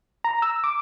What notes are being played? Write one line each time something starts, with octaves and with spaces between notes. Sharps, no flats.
A#5
E6
D6